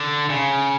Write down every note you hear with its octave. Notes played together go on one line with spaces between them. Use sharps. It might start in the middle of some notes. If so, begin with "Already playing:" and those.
Already playing: D3
C#3